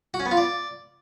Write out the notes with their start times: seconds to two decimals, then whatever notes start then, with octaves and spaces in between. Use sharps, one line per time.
0.14 F#4
0.20 C#4
0.26 B3
0.31 F4
0.37 D5